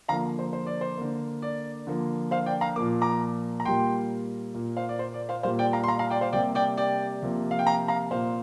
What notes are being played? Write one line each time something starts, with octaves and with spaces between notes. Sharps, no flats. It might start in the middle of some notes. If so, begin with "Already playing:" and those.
D3 F3 A#3 F5 A#5
C5
C5
D5
C5
D3 A#3
D5
D3 F3 A#3
C5 F5
D5 G5
F5 A#5
A#2 F3 A#3 D6
A#5 D6
A#5
A#2 G3 A#3 G5 C6
A#2 A#3
C5 F5
D5
C5
D5
C5 F5
A#2 G3 A#3 C5 F5
D5 G5
F5 A#5
C6
F5 A#5
F5 A#5
D5 G5
C5 F5
C3 G3 A#3 D5 G5
D5 G5
D5 G5
C3 F3 A#3
F5
G5
F5 A#5
F5 A#5
A#2 A#3 C5 F5